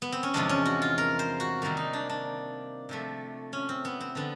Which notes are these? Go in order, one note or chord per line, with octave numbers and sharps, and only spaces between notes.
B3
C4
C#4
E2 C3 F3 G#3 D4
C#4
F#4
F4
A#4
C5
F#4
C3 D#3 G3 A#3
D#4
D4
D4
C3 F3 A3
C#4
C4
B3
C4
D3 F3 B3